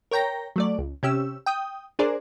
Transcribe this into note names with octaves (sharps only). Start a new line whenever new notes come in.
A#4 C#5 G5 A#5 A#6
F#3 A3 D5
C#2
C3 C#4 G4 E6
G5 D#6
D4 G#4 A#4 C5 D5